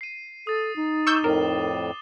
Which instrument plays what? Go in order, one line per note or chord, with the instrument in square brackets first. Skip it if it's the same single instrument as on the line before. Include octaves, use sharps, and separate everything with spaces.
[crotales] C7 D#7
[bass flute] A4 [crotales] D#6 A6
[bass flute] D#4
[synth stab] C#6 E6 G6 [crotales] D6 E7 G7
[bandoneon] F2 A2 [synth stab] A#4 [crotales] E7